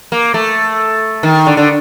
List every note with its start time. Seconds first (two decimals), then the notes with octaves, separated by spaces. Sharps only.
0.12 A#3
0.34 A3
1.23 D#3
1.47 D3
1.57 D3